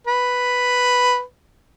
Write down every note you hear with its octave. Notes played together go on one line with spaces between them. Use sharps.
B4